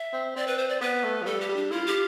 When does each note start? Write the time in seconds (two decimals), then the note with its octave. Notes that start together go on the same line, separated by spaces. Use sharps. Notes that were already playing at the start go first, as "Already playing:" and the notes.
Already playing: E5
0.13 C4
0.36 C4 D5
0.47 B4
0.58 C5
0.69 D5
0.81 B3 B4
1.03 A3
1.22 F3
1.26 G3 A4
1.41 G4
1.49 G3
1.56 D4
1.71 E4 F4
1.86 G4